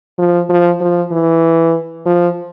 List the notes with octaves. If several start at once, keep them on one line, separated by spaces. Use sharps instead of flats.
F3
F3
F3
E3
F3